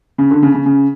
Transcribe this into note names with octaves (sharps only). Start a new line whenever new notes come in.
C#3
D3
C#3
C#3
C#3